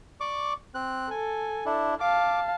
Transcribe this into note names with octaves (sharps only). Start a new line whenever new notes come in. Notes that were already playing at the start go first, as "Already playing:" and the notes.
D5 C#6 D6
C4 F#6
A4 G#5
D4 E4
F5 A5 D6